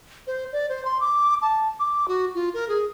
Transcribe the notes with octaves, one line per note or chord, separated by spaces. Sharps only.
C5
D5
C5
C6
D6
A5
D6
F#4
F4
A#4
G#4